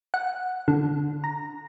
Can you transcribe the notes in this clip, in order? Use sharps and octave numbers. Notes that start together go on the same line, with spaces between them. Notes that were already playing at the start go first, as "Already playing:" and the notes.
F#5
D3
A#5